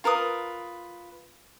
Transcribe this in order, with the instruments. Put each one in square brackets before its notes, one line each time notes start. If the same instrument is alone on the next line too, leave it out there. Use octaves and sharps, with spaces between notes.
[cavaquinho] F4 A#4 B4 D#6